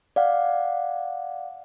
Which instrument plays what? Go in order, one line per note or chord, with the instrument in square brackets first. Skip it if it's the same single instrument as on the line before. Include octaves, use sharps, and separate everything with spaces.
[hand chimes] D5 F5 F#5